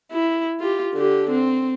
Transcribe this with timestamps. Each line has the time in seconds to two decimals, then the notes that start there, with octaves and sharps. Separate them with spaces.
0.12 E4
0.59 F4 G4
0.94 D3 G4
1.31 C4